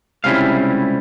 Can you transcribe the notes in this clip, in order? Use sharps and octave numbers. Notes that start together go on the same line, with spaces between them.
C#2 C3 G3 C#4 E4 F5